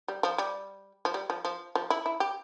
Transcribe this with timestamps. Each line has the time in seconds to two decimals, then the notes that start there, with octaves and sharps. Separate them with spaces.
0.08 G3
0.23 F3
0.38 G3
1.05 F3
1.14 G3
1.30 F3
1.45 F3
1.75 F3
1.90 E4
2.06 E4
2.20 G4